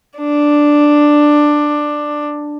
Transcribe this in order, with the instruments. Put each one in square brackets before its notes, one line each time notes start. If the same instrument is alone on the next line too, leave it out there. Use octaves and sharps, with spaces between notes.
[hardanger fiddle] D4